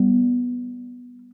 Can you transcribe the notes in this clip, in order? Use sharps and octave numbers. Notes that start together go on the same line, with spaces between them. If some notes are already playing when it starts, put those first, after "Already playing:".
Already playing: G3 B3